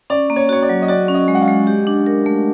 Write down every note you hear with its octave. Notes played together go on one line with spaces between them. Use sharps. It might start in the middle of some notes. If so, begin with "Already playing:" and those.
C#4 D5
A#3
C#5
F#4 C#5
D5
F#3
D#5
F#4 D5
C#4
D#5
G#3
F#5
F5
G#3
G4
D4
A#4
A3